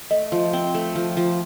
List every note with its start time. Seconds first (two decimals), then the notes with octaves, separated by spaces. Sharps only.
0.10 A3 D#5
0.32 F3
0.53 C4
0.74 A3
0.95 F3
1.17 F3